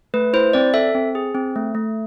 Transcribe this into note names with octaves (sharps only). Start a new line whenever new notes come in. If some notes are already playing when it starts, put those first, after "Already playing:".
A3 B4
E4 C5
C4 D5
A4 E5
C4
G#4
C4
A3
A3